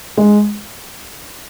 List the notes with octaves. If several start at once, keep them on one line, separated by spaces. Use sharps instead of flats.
G#3